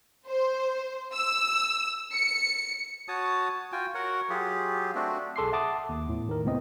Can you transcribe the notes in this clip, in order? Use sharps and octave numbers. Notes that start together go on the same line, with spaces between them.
C5
E6
C#7
F#4 C#5 A5 D#6
F4 F#4 G5 G#5
F#4 A#4 C#5 F#5
F#3 F4 G4 G#4
A3 C4 D4 F#4
B1 G#4 A4 C6 D6 C7
E5 F#5 A5 D6 D#6
D#2
E2 A2
D#3 A#4
C#2 A2 B3 C4 D#5